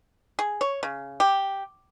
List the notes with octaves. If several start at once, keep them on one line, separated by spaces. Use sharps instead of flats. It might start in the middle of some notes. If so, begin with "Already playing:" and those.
G#4
C#5
C#3
G4